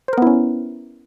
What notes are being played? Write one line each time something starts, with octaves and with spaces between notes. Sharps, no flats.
B3 C#4 E4 A#4 C5